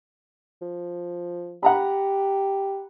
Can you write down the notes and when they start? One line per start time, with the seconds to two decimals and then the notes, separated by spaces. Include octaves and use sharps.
0.62 F3
1.63 G4 F#5 A#5 B5